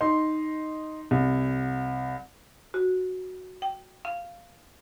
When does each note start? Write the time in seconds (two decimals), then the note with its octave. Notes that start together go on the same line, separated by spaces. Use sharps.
0.01 D#4 C6
1.11 C2
2.74 F#4
3.62 G5
4.05 F5